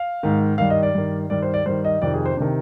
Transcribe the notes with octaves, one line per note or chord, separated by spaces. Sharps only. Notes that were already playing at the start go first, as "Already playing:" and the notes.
Already playing: F5
G#2 D#3
G2 D#3 F5
D#5
D5
G2 D#3
G2 D#3 D5
C5
D5
G2 D#3 C5
D#5
F2 C3 D#3 D5
G#4
C5
C3 D#3 D4